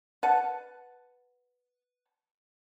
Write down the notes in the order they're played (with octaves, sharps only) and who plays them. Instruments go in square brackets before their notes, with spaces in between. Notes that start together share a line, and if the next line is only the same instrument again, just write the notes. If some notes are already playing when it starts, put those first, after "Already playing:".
[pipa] B4 F#5 A5